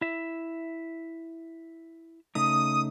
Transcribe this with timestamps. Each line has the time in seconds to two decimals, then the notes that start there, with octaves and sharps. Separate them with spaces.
0.01 E4 E5
2.35 C#3 A3 D#4 D#6